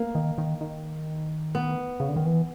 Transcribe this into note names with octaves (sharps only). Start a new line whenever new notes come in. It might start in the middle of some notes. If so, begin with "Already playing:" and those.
Already playing: A#3
D#3
D#3
D#3
B3
C#3
D3
D#3
E3